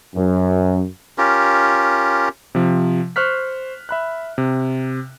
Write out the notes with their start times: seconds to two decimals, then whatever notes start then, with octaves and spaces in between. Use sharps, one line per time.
0.15 F#2
1.18 C#4 F4 G4 A#4
2.55 C3 F3
3.16 C5 C#6 F6 F#6 B6
3.89 E5 B5 F#6
4.38 C3